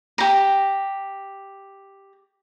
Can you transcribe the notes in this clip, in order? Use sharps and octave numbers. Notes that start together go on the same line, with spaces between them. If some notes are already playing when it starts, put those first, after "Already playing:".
G4 A#5